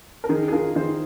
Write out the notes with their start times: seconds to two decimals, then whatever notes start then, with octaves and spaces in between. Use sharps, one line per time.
0.24 A#4
0.29 D#3 D#4 G#4
0.48 G#4
0.53 D#3 F4 A#4
0.75 D#3 G#4 C5